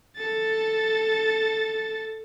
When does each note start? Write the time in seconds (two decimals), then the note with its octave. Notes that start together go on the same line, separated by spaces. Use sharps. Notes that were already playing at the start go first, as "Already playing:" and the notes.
0.17 A4 A6